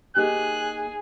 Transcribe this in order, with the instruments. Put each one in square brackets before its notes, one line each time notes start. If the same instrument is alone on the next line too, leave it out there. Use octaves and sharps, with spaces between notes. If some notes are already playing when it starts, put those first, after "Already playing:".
[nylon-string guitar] A#3 D#4 G4 [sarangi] G#4 [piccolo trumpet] F#6